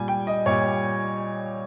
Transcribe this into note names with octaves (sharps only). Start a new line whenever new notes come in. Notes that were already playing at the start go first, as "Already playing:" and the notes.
Already playing: A#2 G3 G#5
G5
D#5
A#2 G3 C#5